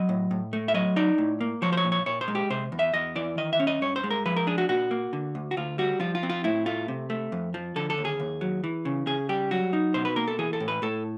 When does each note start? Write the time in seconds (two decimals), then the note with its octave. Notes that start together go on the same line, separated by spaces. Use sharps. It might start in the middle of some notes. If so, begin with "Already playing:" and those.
Already playing: F#3 D#5
0.09 A2
0.31 A2
0.53 A3
0.68 E5
0.74 F#3 D#5
0.96 D#4 D5
1.18 A2
1.41 A#3
1.62 F3 C#5
1.73 C5
1.77 C#5
1.85 A#2
1.92 C#5
2.06 A#2 C#5
2.21 C5
2.28 G#3
2.35 G4
2.50 C3 C5
2.72 E2
2.79 E5
2.94 E2 D#5
3.16 E3 D5
3.37 D#3 D#5
3.53 E5
3.60 C#4
3.67 D#5
3.82 G2 C#5
3.96 C5
4.04 G#3
4.11 A#4
4.25 F3 B4
4.36 A#4
4.47 D4 G#4
4.58 F#4
4.69 A#2 F#4
4.91 A#3
5.13 D3
5.35 D2
5.51 F#4
5.57 D2 F4
5.78 G3 F#4
6.00 F3 F4
6.15 F4
6.23 C4
6.30 F4
6.44 A2 E4
6.66 A3 F4
6.88 C3
7.10 A3
7.32 F2
7.54 F3
7.76 D3 A4
7.90 A4
7.98 D#2
8.05 G#4
8.20 D#2
8.41 F#3
8.64 E3
8.85 C#3
9.07 C#3 G#4
9.29 G3 G4
9.51 F#3 F#4
9.73 D#4
9.94 B2 C5
10.05 B4
10.16 A#3 A#4
10.28 A4
10.39 E3 G#4
10.53 A4
10.60 A2
10.68 B4
10.82 A2 A4